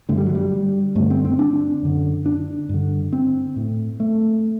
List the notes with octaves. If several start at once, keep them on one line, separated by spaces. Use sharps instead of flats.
G2 D3 A3
G3
F#3
G3
G2 D3 A3
C4
C4
D4
F#2 D3
D4
G2 D3
C4
A2
A3